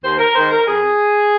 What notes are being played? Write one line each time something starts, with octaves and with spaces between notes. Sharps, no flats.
D#2 C5
A#4
D#3 G#3 C5
A#4
F2 G#4